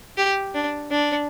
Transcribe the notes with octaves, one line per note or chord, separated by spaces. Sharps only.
G4
D4
D4